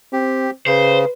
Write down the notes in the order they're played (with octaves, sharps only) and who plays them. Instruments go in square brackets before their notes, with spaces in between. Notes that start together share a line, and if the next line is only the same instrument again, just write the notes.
[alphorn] C4 [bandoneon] G4
[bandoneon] C#3 [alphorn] B4 [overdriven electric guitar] C5